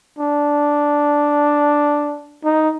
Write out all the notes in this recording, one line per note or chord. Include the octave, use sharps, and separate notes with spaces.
D4
D#4